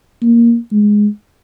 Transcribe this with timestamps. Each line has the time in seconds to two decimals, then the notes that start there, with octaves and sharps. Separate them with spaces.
0.22 A#3
0.72 G#3